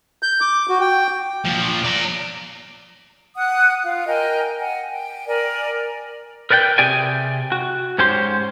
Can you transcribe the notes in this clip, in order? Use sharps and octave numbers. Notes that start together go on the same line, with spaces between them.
G6
D6
F#4
G5
A#2 F3
D5 A#5
F#5 D#6 F#6
F4 F5
A#4 D#5 G5 G#5
F#5 G#5
G5
A#4 D5 G#5
A#4 B4 D5 F#5 G5
C3 G4 G#4 D5 G5 G#5
F#4
G#2 C#4 G4 C5 C6